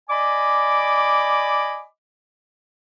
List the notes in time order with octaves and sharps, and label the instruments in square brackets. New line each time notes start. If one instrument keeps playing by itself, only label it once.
[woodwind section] D5 D#5 G#5 B5 D6